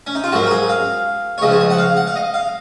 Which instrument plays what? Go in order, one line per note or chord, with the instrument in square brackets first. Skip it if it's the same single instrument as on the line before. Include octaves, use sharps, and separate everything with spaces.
[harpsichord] C#4
D#4
F4
G#2 F#3 A#3 C#4 F#4
A#4
G#4
F5
C#5
C#2 C#3 F3 D#5
C#5
D#5
F#5
F5
F#5
F5
D#5
F5